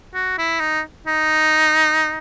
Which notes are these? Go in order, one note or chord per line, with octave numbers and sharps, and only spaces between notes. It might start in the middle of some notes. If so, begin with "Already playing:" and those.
F#4
E4
D#4
D#4